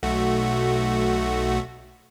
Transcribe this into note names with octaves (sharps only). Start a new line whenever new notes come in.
B1 A3 F#4